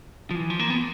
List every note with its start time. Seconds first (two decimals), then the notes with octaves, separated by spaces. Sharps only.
0.31 F3
0.35 E3
0.50 F3
0.59 A#3
0.70 B3